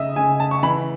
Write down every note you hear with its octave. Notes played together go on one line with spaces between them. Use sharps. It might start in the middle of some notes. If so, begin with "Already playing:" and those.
Already playing: C#3 D#5 E5
C#3 G#5
A5
C#6
E3 B5